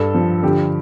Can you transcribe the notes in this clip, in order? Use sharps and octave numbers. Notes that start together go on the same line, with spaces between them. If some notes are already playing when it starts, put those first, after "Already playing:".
Already playing: G2 A4
F3
D3 G4